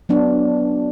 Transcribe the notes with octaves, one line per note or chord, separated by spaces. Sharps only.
F#3 B3 D4